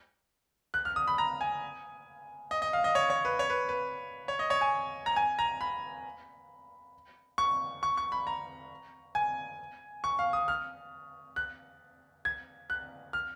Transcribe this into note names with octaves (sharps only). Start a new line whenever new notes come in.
F#6
F6
D#6
B5
A#5
G#5
D#5
D#5
F5
D#5
C#5
C#5
B4
C#5
B4
B4
C#5
D#5
C#5
G#5
A#5
G#5
A#5
B5
C#6
C#6
C#6
B5
A#5
G#5
C#6
F5
D#6
F6
F#6
G#6
F#6
F6